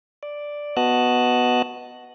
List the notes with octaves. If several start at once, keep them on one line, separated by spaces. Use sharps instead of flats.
D5
B3 F#4 D#5 A5 F#6